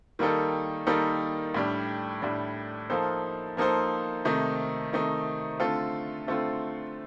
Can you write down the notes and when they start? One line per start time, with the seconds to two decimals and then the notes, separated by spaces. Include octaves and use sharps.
0.19 D#3 G3 A#3 D#4 A4
0.87 D#3 G3 A#3 D#4 A4
1.55 A2 G3 D4
2.22 A2 G3 D4
2.90 F3 A#3 D#4 A4 C5
3.57 F3 A#3 D#4 A4 C5
4.25 C3 D#3 A3 D#4
4.93 C3 D#3 A3 D#4
5.60 D3 A3 C4 F4 A4
6.27 D3 A3 C4 F4 A4